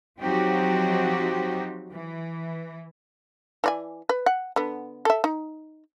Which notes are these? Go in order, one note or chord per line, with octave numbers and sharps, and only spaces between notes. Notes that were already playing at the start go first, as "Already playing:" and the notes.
F3 F#3 C4 D#4 F#4 G4
E3
E3 D5 G#5
B4
F#5
D3 B3
A4 E5
D#4